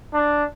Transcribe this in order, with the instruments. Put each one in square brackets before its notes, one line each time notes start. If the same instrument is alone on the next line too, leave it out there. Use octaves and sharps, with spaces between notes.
[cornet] D4